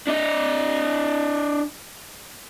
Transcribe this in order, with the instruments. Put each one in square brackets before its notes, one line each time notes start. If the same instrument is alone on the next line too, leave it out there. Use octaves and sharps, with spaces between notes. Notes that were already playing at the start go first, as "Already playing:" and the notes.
[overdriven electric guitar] D4 D#5